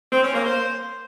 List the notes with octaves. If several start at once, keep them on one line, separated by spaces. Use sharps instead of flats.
C4
C#4
A#3
C5